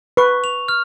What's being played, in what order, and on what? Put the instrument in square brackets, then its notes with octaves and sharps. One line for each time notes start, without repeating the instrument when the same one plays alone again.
[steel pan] B4 [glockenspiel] C#6
[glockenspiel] F7
F6